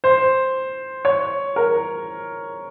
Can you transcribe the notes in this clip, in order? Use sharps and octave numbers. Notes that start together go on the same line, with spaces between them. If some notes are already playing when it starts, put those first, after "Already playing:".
C5
C#5
A#4